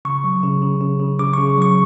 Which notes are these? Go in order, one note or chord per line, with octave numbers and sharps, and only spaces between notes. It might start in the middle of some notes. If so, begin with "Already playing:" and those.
C#3 C#6
F#3
C#3
C#3
C#3
C#3
C#3 D6
C#3 C#6
F#3 C#6